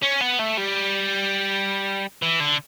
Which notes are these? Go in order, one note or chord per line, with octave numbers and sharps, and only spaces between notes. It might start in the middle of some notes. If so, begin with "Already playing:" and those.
C#4
B3
A3
G3
E3
D3